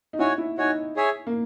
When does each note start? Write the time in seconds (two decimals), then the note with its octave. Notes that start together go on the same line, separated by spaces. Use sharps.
0.13 D#4
0.19 E4 F#4 C#5 G#5
0.38 E4
0.58 D#4 F#4 C#5 G#5
0.96 G#4 C#5 E5 G#5
1.27 A#3